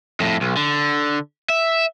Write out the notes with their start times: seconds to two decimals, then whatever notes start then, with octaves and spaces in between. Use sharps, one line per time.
0.20 F2 A2
0.41 B1
0.57 D3
1.50 E5